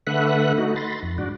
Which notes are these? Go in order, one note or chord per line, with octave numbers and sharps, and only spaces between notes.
D3 A3 B4 E5 F#5 F#6
A3 D#4 F#4
B5 C6 A6 A#6
F2
G#2 D4 F#4